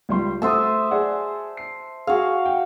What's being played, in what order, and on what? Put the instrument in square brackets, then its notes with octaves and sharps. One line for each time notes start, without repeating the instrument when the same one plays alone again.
[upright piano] C#2 G3 C6
[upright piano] A3 F#5 D#6 [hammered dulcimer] C5 E5 A5
[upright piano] G#4 D5 F#5
C7
[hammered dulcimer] F#4 F5 [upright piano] G#4
[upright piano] G5